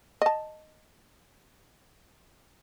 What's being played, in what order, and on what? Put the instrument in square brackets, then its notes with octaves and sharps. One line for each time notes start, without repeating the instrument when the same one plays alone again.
[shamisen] D#5 A5